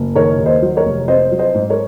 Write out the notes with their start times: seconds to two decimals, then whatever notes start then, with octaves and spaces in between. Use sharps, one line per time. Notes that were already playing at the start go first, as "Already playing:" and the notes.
Already playing: F#1
0.15 D#3 A#4 C#5
0.38 D#2
0.46 C5 D#5
0.62 F#3
0.77 A#4 C#5
0.86 F1
1.08 C4 C5 D#5
1.31 F#3
1.39 C5 D#5
1.55 G#2
1.70 A#4 C#5